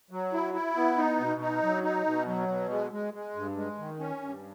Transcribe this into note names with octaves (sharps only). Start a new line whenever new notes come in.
F#3
E4
E4
B3
D#4
B2
D#4
F#3
D#4
B2
F#3
B2
G#3
G#3
G#3
G2
G#3
D#3
C#4
G2